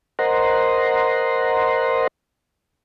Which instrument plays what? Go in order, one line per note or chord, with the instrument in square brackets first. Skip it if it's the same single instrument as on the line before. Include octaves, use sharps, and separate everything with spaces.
[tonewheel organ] A#4 C5 D#5 F#5 A#5 C6